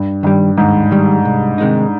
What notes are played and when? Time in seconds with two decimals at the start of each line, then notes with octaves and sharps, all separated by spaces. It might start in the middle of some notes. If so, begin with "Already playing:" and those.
Already playing: G2
0.23 G2 D#3 G3
0.57 D#2 G#2
0.91 D#3 G3
1.25 C2
1.58 C3 D#3 G#3 D#4